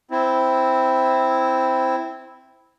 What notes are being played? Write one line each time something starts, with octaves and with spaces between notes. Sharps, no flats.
C4 E4